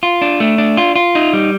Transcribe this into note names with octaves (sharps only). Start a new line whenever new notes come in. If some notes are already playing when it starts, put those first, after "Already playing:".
F4
D4
A3
D4
F4
F4
D#4
G3